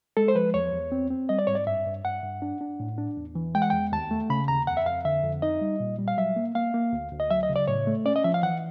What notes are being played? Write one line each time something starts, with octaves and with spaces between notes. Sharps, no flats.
G#3 A4
C5
F3 B4
E2 C#5
E2
C4
C4
G3 D#5
D5
G#2 C#5
D5
G2 E5
G2
G2 F#5
G2
D4
D4
A2
D4
E2
E3
G#3 G5
F#5
E2 G5
D#2 A5
A3
C#3 B5
D#2 A#5
F2 F#5
E5
F2 F5
D3 E5
F2
D#4 D#5
G3
A#2
G3
F5
F#3 E5
A#3
A#3 F5
A#3
D2
D2
D#5
F#3 E5
D#5
C#3
D5
A2 C#5
A3
C#4 D5
D#5
F3 E5
F5
E3 F#5